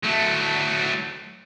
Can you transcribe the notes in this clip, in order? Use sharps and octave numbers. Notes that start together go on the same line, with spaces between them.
F#3 A3